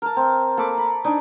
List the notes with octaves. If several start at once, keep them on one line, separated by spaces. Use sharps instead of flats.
A#4 A5
C4
A#3 A4 B5 D6
B5
D4 D#4 D5 G#5